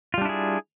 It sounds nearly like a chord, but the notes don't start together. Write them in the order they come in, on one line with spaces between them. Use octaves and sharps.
F4 G3 D4 E4 G#4